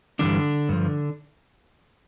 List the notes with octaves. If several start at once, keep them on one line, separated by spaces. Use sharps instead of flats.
G2 D3 E3 G3 D4
G2 F3